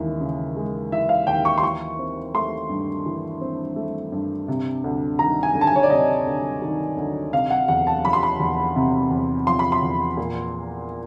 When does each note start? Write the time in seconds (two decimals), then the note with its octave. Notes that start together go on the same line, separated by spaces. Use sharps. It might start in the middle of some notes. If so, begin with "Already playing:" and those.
Already playing: D#2 C#3 E3 G#3
0.21 C#3
0.56 G#3
0.92 E3 E5
1.09 F5
1.27 D#2 G5
1.45 C#6
1.58 C6
1.62 E3 C#6
1.99 C4
2.34 A3 C6
2.69 G2
3.06 E3
3.41 C4
3.76 A3
4.12 G2
4.48 C3
4.84 D2
5.19 D#3 A#5
5.43 G#5
5.55 D2
5.61 A5
5.67 G#5
5.76 C#5
5.83 D5
5.90 C3 D#5
6.26 D2
6.62 D#3
6.97 D2
7.32 C3 F5
7.50 F#5
7.68 E2 F#5
7.87 A5
8.04 F3 B5
8.13 C6
8.23 B5
8.40 E2
8.76 C3
9.11 E2
9.47 F3 C6
9.59 B5
9.72 C6
9.83 E2
10.17 A#2